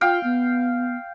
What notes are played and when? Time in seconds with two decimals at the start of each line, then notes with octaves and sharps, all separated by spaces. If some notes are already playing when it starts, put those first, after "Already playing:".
0.01 F4 F5 G5
0.24 B3